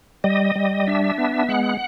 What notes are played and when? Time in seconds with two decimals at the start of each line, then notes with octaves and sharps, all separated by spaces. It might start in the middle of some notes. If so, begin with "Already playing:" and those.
0.24 G3 D#5
0.56 G3
0.87 D4 E5
1.18 B3
1.49 G#3 F#5